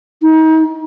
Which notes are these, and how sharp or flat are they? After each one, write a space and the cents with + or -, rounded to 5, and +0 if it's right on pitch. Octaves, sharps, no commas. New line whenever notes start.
D#4 +35